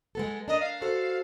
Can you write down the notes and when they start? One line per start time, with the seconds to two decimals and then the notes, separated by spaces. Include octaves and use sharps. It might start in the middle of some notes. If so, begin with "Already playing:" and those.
0.15 G#3 B3 A4
0.48 D4 A#4 D#5
0.60 F5
0.82 F#4 A4 C5